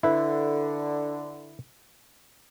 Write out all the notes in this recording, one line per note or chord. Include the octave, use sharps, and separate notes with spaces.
D3 E4 B4